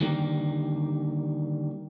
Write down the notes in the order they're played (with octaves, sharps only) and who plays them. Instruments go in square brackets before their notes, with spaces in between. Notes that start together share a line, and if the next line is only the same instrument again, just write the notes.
[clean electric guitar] D3 D#3 G3 A#3